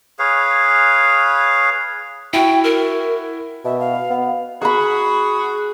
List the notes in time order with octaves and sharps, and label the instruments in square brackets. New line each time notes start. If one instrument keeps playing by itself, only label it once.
[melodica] G#4 B4 C#5 F5
[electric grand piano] E4 F#4 [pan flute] G5
[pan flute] A#4
[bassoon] B2 [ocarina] E5
[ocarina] F5
[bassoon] B3
[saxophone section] F#4 G#4 [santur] B5 C#6